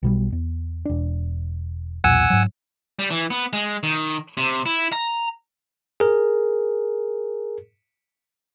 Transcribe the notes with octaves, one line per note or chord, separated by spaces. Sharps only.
B1 B2 G3
E2
E1 D4
B1 E2 A#2 F#5 G#5 E6
G#2 F#3
G3
E3
B3
G#3
D#3
C3
E4
A#5
G#4 A#4